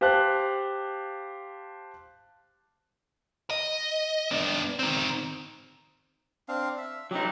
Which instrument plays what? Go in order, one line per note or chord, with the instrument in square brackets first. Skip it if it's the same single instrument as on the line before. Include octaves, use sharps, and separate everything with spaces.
[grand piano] G4 C5 F5 A5 F#6
[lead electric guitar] D#5
B3 D4
D#3 C4
[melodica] C4 D4 F5
E5 E6
[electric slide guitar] F#3 D#4 [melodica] G4